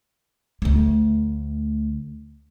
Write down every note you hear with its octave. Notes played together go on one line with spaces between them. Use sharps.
D2 A3